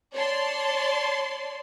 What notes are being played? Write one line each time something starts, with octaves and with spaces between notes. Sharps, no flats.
C#5 D5 A5 C6